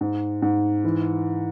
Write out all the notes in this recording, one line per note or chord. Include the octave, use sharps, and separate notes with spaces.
G#2
G#2
E3